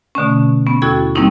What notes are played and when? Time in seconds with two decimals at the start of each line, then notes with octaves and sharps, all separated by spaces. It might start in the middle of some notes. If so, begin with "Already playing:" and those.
0.15 B2 D3 A3 C#4
0.66 B3 C#4
0.82 D#2 E4 F#4 A4 C#6 G#6
1.15 G3 A#3 C4 C#4 D#4 E4